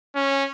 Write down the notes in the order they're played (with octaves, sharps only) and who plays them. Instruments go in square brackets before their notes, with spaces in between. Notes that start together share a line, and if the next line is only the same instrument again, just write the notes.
[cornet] C#4